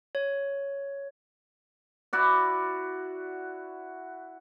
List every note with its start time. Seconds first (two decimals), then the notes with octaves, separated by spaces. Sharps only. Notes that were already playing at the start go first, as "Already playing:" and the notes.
0.15 C#5
2.13 E4 F#4 D5